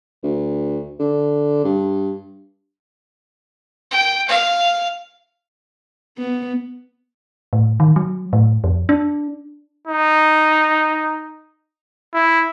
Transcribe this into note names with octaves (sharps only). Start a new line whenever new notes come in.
D2
D3
G2
G5
F5
B3
A2
D#3
F#3
A2
F2
D4
D#4
E4